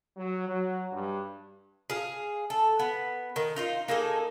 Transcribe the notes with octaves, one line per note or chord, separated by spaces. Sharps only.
F#3
F#3
G2
G#4 F5
A4
B3
D#3
D#4 F4 C5
A#3 D#4 G#4 A4